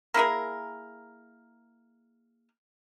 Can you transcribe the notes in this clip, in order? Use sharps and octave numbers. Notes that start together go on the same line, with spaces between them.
A#3 E4 G#4 A#4